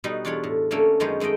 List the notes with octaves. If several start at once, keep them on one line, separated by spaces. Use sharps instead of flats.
B2 G3 D#4 B4
E2 D4 F4 C#5 B5
A2
D3 A3 A#3 C#4
F#2 D#3 G#3 B3 C#4 C5
D#3 G#3 A3 D#5 G5